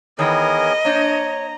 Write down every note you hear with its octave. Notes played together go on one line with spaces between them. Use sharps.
D#3 E3 B3 G#4 A#4 C#5 D#5 G5
A#3 D4 C5 C#5 A#5